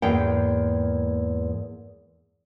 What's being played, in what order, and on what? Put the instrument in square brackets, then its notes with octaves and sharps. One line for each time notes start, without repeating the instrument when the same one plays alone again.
[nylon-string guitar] E2 G#2 A#3 G5